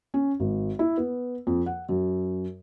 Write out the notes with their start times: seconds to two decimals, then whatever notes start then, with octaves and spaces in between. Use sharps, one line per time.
0.14 C#4
0.40 G#1
0.79 E4
0.98 B3
1.47 F2
1.66 F#5
1.89 F#2